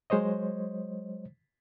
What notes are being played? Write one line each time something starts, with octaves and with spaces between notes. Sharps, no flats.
F#3 G#3 C5 C#5 D#5